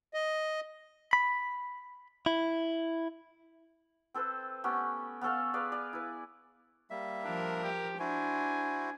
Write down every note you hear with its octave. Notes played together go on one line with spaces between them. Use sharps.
D#5
B5
E4
C4 A4 B4 C5
A3 B3 C#4 G4
B3 C#4 A4 F5
G#4 B4 D5 F5
D5 G#5
E4 B4
G3 A#3 E5
F3 D4 A#4
G4
D4 E4 F#4 C5 G#5